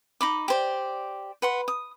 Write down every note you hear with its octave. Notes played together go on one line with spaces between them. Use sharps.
D#4 B5 D6
G4 C5 D5
B4 F#5 C6
D#6